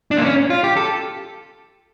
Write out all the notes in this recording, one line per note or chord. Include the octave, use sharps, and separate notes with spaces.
D4
A#3
C#4
F4
G4
A4